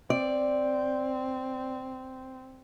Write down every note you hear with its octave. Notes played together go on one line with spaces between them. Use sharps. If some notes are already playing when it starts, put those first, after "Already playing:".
C4 D5